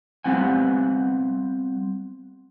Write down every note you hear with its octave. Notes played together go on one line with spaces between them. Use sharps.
G3 B3 C4 F#5 G#5